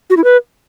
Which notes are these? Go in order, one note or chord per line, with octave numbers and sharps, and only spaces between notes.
F#4
E4
B4